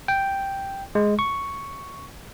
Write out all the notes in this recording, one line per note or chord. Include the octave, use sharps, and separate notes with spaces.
G5
G#3
C#6